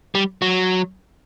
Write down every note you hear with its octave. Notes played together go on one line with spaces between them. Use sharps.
G3
F#3